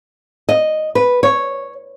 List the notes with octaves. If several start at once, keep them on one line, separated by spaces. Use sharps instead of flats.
D#5
B4
C#5